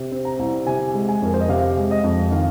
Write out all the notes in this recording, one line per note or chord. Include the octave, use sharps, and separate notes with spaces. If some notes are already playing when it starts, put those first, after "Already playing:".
Already playing: C3
C4
A#5
C2
C3 G#5
G#3
G#5
F2 A#4
C5
D#5
C3 F5
G#3
D#5
F2
D#3 F5